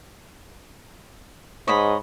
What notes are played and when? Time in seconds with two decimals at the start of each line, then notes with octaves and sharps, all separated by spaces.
1.68 G#2 C#5 D#5 B5